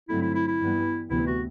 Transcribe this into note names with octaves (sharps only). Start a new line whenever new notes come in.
G2 D3 F#3 A3 C4 E4
E4
E4
E4
G2 E3 G3 B3
D2 C3 E3 B3 E4
F#4